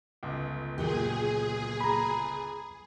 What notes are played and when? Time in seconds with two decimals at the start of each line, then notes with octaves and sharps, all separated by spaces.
0.23 G1 C#2
0.78 A#2 F#3 G4 G#4
1.81 A#5 B5